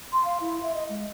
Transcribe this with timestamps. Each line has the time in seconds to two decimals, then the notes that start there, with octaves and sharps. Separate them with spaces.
0.12 C6
0.25 F5
0.40 E4
0.63 E5
0.74 D#5
0.89 G#3